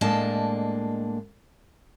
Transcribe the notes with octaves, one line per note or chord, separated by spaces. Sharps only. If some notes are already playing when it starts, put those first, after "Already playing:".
A2 G#3 A#3 D4 D#5 A5